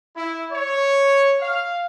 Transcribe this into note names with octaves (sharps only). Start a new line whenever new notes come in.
E4
C#5
F5